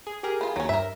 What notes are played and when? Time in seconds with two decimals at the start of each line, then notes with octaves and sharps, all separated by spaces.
0.07 G#4
0.23 G4 G#4 A#4
0.41 B3 F4
0.56 D#2 F#3 C#4
0.69 G2 A#4 E5